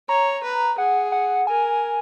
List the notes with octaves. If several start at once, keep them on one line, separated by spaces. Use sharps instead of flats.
C#5 A#5
B4
G#4 F#5
F#5
A#4 G#5